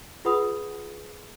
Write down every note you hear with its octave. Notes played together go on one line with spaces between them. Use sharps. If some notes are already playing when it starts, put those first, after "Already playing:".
F4 G#4 B4 F#5 B5 D#6